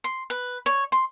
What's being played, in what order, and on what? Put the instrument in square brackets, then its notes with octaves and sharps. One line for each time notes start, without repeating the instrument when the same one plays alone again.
[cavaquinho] C6
B4
C#5
C6